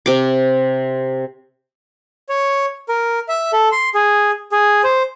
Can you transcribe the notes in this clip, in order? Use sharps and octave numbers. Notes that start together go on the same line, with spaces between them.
C3 D6
C#5
A#4
E5
A4
C6
G#4
G#4
C5